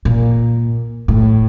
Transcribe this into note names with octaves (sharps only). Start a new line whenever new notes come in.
A#2
A2